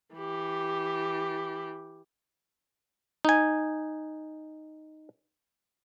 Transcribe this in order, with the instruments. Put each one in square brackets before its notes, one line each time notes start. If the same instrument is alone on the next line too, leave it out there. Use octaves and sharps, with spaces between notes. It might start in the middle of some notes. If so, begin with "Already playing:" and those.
[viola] E3 G4
[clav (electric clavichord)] D#4 G#5